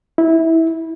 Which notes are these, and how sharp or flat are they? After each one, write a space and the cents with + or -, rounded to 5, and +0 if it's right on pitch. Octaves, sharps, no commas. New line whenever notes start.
E4 -20